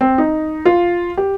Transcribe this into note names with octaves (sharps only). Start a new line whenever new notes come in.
C4
D#4
F4
G4